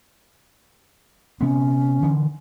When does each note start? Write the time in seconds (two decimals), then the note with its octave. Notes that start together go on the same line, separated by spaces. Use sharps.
1.41 C3 B3 C#4
2.03 D3 E3